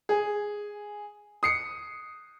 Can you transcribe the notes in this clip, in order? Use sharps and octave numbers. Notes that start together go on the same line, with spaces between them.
G#4
D#6 C7 C#7